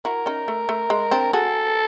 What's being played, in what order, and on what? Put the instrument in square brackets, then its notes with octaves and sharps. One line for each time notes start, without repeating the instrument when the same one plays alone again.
[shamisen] E4 F#4 [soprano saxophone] A#4
[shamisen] C#4 D#4
A3
A3
G#3
C4 D4
[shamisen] F#4 G#4 [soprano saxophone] A4